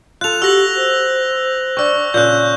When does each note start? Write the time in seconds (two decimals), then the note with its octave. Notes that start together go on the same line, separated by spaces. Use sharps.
0.21 F4 A4 F#6 F7
0.42 F#4 G4 E6 A#6 F#7
0.76 C5
1.77 D4 G5 C#6 E6
2.14 A#2 C#3 F#6 G6